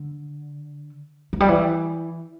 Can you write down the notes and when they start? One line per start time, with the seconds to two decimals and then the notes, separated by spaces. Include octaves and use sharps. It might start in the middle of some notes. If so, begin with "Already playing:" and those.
Already playing: D3
1.33 E3
1.40 G3
1.49 E3